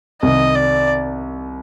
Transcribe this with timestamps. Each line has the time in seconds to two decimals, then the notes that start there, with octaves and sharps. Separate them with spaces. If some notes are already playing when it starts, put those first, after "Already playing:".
0.22 C2 C3 D#3 D#5
0.55 D5